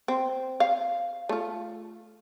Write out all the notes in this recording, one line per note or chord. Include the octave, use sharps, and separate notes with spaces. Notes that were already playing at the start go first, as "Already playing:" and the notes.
C4
F5
A3 F4